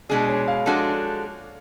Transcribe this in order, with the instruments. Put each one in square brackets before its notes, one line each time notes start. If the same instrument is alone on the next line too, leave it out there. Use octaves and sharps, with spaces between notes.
[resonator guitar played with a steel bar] B2 G#3 D4 G#4 [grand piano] D5
[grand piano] C#5
F5
[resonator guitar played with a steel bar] F3 G#3 D4 F#4 A4